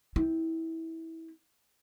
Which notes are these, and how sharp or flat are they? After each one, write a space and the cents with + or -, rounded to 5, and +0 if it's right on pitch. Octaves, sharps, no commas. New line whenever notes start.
C4 -5 E4 -20